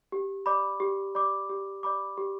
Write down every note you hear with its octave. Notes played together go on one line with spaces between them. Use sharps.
G4
D5 B5 D6
G4
D5 B5 D6
G4
D5 B5 D6
G4